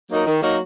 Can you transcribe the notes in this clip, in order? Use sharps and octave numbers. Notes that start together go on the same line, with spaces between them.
F#3 A#3 D#4 A#4
D#3
F#3 A#3 D#4 A#4